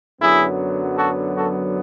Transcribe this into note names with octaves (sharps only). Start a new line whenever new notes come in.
F#2 D3 F#3 B3 E4 G#4
F#4 A4
F#4 A4